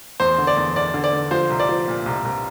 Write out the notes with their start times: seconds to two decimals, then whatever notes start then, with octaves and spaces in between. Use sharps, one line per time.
0.20 E2 C5
0.38 D3
0.47 D5
0.57 E2
0.75 E2 D5
0.94 D3
1.04 D5
1.13 D3
1.31 F3 C5
1.50 C2
1.59 D5
1.69 F3
1.88 A#2
2.06 C2
2.25 C2